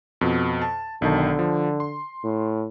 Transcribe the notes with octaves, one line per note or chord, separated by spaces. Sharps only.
F2 B2
A5
B1 D3 D#3 A5
F3
C6
A2